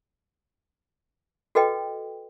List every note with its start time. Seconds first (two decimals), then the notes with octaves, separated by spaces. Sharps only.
1.55 F#4 A4 B4 D#5 G5